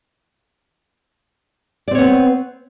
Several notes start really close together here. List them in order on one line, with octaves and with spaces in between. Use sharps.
D5 C4 C#5 B3